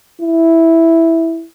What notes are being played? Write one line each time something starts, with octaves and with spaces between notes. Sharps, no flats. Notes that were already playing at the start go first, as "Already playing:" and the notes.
E4